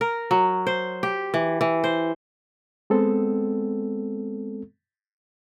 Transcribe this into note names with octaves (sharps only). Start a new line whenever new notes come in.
A#4
F#3
C5
G4
E3
E3
C5
G#3 B3 C4 A4